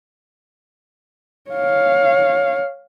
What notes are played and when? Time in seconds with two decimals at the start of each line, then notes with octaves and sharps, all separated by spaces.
1.51 C#5 F5